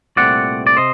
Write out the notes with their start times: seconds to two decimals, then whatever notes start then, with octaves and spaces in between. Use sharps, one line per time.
0.16 C2 A#2 A3 C4 D5 F#5
0.67 D5
0.77 C3 C5 D#5